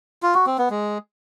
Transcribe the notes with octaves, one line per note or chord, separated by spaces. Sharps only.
F4
F#4
C4
B3
G#3